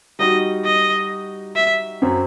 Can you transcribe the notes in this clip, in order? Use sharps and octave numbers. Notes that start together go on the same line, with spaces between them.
G3 D#4 F#4 D#5
D#5
E5
F#2 F#3 C4